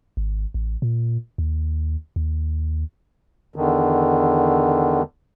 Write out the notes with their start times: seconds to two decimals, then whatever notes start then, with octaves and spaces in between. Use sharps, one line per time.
0.17 G#1
0.54 A1
0.82 A#2
1.38 D#2
2.16 D#2
3.56 E2 D3 D#3